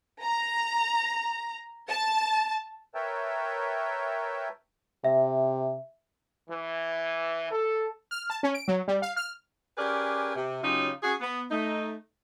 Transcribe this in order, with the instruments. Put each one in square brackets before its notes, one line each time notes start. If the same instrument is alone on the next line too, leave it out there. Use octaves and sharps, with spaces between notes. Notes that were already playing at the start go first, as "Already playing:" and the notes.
[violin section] A#5
A5
[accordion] A#4 B4 C#5 E5 G5 A5
[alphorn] C3 [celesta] E5
[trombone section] E3
A4
[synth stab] F6
A5
C#4
D7
F#3
G3
F5
F6
[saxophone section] C#4 G4 G#4 A#4 B4 D5
C3
C#3 F#3 C#4 D#4 F4 G4
C#4 F#4 G#4
B3
A3 D#4